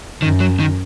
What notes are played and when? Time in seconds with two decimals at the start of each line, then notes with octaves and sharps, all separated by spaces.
0.22 F#2 D#3
0.40 F#3
0.60 D#3